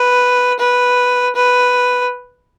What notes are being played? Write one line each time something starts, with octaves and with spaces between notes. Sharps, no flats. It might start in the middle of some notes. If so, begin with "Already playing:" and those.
Already playing: B4
B4
B4